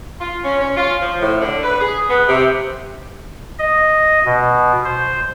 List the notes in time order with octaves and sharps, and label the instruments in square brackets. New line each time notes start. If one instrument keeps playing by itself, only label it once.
[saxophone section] F4
C#4
C#4
F4
F3
A2
D3
B4
G#4
B3
C3
[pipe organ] D#5
B2
C5